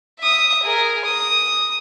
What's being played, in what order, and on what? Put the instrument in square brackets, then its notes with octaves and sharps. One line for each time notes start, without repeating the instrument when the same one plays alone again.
[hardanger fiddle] E5 D#6
G#4 A#4
D#6